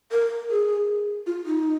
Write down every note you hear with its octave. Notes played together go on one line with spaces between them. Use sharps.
A#4
G#4
F4
D#4